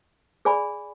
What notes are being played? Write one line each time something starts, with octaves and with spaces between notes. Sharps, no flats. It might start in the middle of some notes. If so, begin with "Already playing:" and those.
G#4 D5 G#5 B5